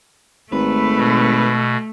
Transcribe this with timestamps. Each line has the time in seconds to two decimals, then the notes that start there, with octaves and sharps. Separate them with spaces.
0.52 G#1 A3 B4
0.96 B2